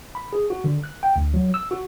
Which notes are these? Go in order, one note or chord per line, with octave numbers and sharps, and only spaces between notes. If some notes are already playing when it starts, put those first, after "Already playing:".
B5
G#4
F#4
D3
F#6
G5
D2
F#3
E6
F#4